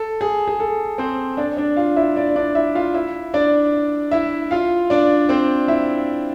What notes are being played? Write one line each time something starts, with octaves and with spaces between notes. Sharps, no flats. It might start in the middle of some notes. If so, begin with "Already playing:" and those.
Already playing: A4
G#4
G#4
A4
C4 C5
D4 D5
D4 D5
F4 F5
E4 E5
D4 D5
D4 D5
E4 E5
F4 F5
E4 E5
D4 D5
E4 E5
F4 F5
D4 D5
C4 C5
E4 E5